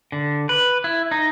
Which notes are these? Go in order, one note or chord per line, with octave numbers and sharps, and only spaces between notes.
D3
B4
E4
D#4